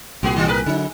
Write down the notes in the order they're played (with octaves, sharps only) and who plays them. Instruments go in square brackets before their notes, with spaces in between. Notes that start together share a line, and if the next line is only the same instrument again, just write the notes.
[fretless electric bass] C2 A#2 [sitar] B3 F#4 G#4
[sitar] D#3 G3 F4
G#4 A#4 B4
[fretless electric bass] D3 F#3 [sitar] D#4